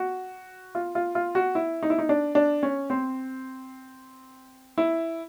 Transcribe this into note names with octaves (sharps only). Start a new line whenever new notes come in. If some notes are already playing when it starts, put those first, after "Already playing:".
Already playing: F#4
F4
F4
F4
F#4
E4
D#4
E4
D#4
D4
D4
C#4
C4
E4